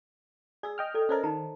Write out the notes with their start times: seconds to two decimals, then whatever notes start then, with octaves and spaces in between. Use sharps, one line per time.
0.63 G#4 D5 E6
0.78 D#5 G5 F6
0.94 A4 D5
1.09 C#4 A4 A#4 C5 D5 D#5
1.23 D#3 D#4 A#5